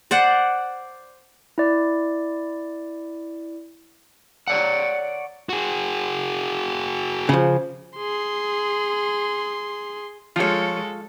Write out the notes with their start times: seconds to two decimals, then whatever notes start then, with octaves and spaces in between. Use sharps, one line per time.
0.11 C5 D5 F#5
1.58 E4 D5
4.48 C#5 D5 F#5
5.49 F#4 G#4
7.29 C#3 F3
7.97 G#4 C6
10.36 F3 G#3 F4 A4 C#5